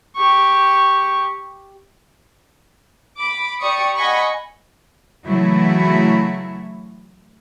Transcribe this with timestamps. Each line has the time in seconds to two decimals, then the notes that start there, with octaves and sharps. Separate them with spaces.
0.16 G4 C#6
3.17 B5 D6
3.59 G4 D5 C#6 D#6 C#7
3.95 D#5 F#5 G#5 B5 C#6
5.27 C#3 E3 F#3 A3 E4 F#4